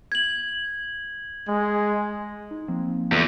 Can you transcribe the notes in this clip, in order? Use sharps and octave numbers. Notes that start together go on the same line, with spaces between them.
G#6 F#7
G#3
D#4
F3 A#3 C4
E2 F4 A4